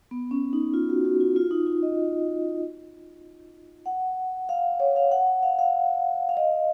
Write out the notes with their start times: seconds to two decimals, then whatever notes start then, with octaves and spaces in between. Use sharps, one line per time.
0.11 B3
0.31 C#4
0.53 D#4
0.74 F4
0.89 F#4
1.05 F#4
1.21 F4
1.36 F4
1.51 D#4
1.67 F4
1.83 D#5
3.86 F#5
4.49 F5
4.80 C#5
4.96 F5
5.12 F#5
5.27 F#5
5.43 F5
5.59 F5
6.29 F5
6.37 D#5